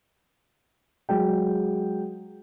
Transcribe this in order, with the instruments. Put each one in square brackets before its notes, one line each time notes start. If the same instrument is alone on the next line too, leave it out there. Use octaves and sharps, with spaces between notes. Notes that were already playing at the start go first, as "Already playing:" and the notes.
[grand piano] F#3 G#3 G5